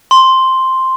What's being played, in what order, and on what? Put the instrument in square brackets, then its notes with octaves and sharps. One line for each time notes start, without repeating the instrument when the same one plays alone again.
[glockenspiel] C6